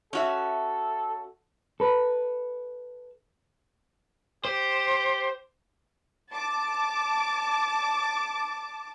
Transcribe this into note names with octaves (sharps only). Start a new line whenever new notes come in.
C#4 F#4 A4 E5
A4 B4
G4 C5
A5 D6